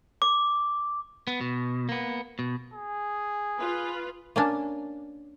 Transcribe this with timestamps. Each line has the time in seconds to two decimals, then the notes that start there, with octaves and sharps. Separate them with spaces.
0.22 D6
1.27 B3
1.41 B2
1.89 A#3 B3
2.39 B2
2.74 G#4
3.58 F4 B4
4.36 A#3 C#4 D4